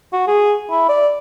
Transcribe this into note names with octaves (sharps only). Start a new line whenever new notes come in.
F#4
G#4
E4
D5